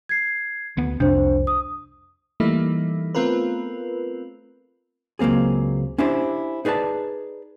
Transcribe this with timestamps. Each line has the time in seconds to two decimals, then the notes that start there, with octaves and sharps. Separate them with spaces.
0.09 G#6 C7
0.77 D2 B3
1.00 C2 F2 C3 D4 C5
1.47 D#6
2.40 E3 G3 A3 A#3 D#4 E4
3.15 A3 B3 C4 F4 A#4 B4
5.19 C#2 F#3 A#3 C4 G#4
5.98 C#4 D4 E4 G4 C5
6.65 D#4 G#4 B4 D5 A5